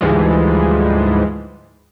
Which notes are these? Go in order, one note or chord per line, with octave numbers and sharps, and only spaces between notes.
D2 G#2 E3 F3 G3 G#3